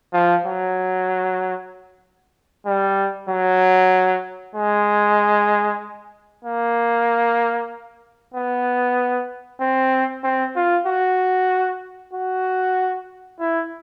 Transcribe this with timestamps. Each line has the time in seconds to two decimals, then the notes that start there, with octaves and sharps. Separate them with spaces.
0.13 F3
0.46 F#3
2.66 G3
3.29 F#3
4.55 G#3
6.45 A#3
8.34 B3
9.61 C4
10.24 C4
10.56 F4
10.87 F#4
12.14 F#4
13.40 E4